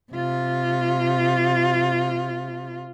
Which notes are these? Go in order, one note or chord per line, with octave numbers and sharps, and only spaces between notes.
C3 F4